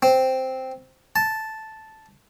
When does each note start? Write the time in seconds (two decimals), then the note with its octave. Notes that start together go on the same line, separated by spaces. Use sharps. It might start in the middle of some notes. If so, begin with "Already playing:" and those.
0.03 C4
1.16 A5